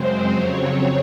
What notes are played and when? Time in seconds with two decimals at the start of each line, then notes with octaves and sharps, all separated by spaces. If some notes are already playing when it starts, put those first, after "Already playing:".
Already playing: F#2 C#3 G#3 C4 C5
0.31 F2 C#3 F#3 C4 C#5